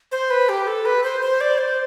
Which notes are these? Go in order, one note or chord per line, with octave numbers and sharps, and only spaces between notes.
C5
B4
G4
A4
B4
C5
C5
D5
C5